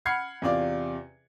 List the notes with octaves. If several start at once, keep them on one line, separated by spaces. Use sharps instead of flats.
F#5 B5 F6 G#6 C7 C#7
E2 C3 F4 D5 D6